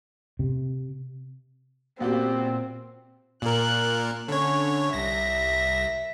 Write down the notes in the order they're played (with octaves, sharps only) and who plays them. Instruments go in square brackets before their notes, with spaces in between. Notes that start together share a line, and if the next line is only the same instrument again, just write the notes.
[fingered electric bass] C3
[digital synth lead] A#2 [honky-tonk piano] B3 F#4 G4 [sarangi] C4
[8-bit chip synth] A#2 A#4 [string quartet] F#6
[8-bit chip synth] D3 C#5 [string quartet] C#4
[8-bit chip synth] C2 A#6 [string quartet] E5